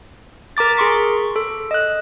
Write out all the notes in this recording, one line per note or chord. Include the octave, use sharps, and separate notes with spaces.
A#4 A#5 D6 A6
G#4 C6 C#6 B6
A4
D#5 F#6